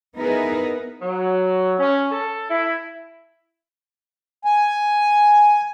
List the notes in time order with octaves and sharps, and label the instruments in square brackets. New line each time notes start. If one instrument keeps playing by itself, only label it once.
[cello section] B3 D#4 E4 G#4 A#4 B4
[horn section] F#3
C#4
A4
E4
[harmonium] G#5